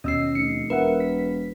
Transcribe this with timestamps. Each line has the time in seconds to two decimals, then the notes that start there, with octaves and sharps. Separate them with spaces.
0.04 D#2 B2 C#4 D#5 E6 C7
0.35 F1 C#7
0.70 E1 A#4 B4 E5 F#5
1.00 B6